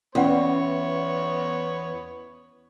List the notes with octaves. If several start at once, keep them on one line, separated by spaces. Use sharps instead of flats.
E2 B3 C#4 C#5 F#5 C6